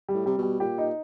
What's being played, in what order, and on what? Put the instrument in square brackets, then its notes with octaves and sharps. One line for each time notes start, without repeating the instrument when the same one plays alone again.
[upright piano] G3
[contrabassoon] A2
[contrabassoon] C3 [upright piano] G3
[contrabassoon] B2
[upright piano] G3
[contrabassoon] A#2 [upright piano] G4
[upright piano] D#4